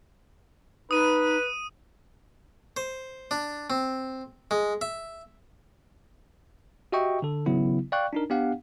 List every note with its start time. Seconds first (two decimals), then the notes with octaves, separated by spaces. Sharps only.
0.91 D#4 B4 D#6 D#7
2.77 C5
3.31 D4
3.70 C4
4.51 G#3
4.81 E5
6.92 F#4 G4 D#5 E5 G5 C#6
7.22 D3 A4
7.46 G#1 C#3 F#3 B3 E4
7.92 D5 F5 G5 C#6 F#6
8.13 D4 D#4 A#4
8.30 B3 D4 G4 F5 F#5